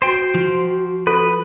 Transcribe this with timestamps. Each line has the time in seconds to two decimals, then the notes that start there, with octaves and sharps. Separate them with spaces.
0.02 F#4 C5 G5
0.35 F3
1.07 A4 B4